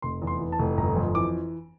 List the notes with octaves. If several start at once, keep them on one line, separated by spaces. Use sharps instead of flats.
F1 C6
E2
C6
E3
A5
F1
G1 A#5
F2
E3 D6